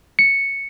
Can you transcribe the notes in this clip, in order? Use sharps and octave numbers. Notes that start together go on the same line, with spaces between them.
C#7